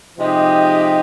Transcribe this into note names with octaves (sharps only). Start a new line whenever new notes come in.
C3 F3 G#3 D#4 G4